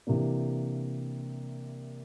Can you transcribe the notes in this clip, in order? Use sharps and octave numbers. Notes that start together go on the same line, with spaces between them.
C3 E3 A#3 D4